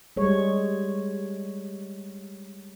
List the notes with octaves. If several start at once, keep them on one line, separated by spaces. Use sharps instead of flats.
G3 G#3 C#5